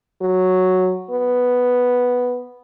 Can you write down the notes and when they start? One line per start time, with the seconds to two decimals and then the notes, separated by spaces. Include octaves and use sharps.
0.22 F#3
1.10 B3